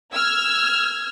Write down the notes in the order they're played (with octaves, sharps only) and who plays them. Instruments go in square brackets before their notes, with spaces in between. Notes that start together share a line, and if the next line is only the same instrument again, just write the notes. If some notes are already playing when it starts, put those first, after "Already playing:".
[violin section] E6 F6 G#6